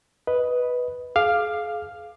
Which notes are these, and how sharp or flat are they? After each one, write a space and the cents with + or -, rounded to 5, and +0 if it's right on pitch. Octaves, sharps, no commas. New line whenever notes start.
B4 +0 D#5 +5
G#4 +35 F5 +0 D6 +20